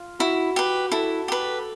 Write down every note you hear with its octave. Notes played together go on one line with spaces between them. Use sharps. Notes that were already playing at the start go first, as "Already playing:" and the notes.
Already playing: F4
E4 F#4
G4 B4
E4 A4
G4 B4